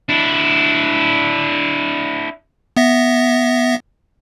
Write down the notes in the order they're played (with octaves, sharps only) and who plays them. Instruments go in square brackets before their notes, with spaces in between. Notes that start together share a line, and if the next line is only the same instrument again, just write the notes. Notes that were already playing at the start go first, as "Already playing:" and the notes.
[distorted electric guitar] D4 E4
[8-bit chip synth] B3 E5 A#6